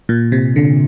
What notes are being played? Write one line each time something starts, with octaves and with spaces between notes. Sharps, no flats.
A#2
C3
D3